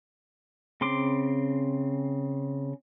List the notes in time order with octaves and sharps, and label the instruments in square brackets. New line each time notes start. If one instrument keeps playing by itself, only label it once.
[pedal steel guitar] C#3 C4 C6 D6